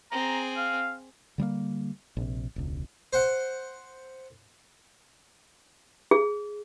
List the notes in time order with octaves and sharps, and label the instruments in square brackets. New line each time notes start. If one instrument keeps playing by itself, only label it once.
[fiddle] C4 G#4 [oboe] A#5
[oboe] F5
[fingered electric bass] D3 G3 A3 A#3
A#1 C3
E1 C#2
[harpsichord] C5 F#5
[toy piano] G#4